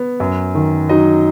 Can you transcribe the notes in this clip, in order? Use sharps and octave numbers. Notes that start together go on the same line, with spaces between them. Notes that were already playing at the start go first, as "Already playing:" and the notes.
Already playing: B3
F#2
D#3
F#3 D#4 D#5